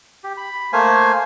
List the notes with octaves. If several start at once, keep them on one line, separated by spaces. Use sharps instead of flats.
G4
B5
A3 A#3 C5 F5 G#5